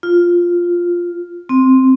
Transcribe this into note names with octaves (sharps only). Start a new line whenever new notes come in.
F4
C4